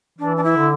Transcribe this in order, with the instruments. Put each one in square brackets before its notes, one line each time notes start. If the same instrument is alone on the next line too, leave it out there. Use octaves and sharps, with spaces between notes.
[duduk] E3 [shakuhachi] D4
[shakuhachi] D4
E4
[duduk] D3